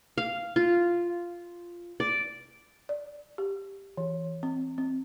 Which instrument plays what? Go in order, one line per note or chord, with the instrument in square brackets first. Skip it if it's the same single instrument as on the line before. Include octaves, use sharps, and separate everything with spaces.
[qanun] F5
F4
D5
[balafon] D5
G4
E3
C4
C4